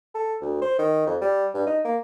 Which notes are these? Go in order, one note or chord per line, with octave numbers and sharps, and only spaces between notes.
A4
D2
C5
D#3
F2
G3
G2
D#4
A#3